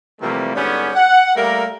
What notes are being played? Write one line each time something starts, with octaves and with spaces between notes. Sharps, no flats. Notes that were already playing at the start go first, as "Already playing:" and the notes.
C3 E3 F3 G3 A3 A#3
G#2 D3 G3 B3 C#4
F#5
G3 A3 A#3 A#4